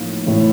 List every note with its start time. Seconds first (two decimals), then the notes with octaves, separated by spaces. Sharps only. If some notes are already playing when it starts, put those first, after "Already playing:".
Already playing: A2 F3 A#3 D#4
0.26 A2 E3 A3